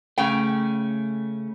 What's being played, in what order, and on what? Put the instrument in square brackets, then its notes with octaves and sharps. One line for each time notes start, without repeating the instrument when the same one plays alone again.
[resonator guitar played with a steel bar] C#3 G5 [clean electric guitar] A3 C#4